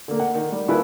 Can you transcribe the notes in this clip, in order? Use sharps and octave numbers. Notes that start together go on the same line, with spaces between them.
D3 A#3
F#5
D#3
G3
D#2 E4 F4 G#4 B4